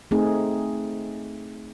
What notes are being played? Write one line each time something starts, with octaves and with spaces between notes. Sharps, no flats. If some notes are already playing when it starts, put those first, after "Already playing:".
A3 C4 D#4 G#4